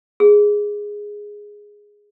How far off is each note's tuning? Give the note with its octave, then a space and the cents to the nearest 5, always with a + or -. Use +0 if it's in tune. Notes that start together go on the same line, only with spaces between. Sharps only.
G#4 -5